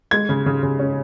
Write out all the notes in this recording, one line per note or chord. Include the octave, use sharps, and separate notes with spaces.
G#3 G#6
C#3
C#3
C#3
C#4